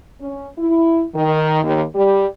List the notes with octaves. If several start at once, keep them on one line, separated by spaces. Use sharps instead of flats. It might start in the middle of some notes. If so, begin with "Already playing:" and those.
C#4
E4
D#3
D#2
G3